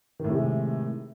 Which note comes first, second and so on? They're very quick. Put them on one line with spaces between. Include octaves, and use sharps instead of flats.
D#3 A2 C3 G#3